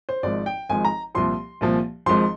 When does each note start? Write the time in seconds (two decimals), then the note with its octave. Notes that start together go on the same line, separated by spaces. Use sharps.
0.09 C5
0.23 G#1 G#2 F3 D5
0.46 G5
0.70 G#1 G#2 F3 G#5
0.85 A#5
1.15 C2 A#2 F3 C6
1.61 C2 A#2 F3
2.06 G#1 G#2 F3 C6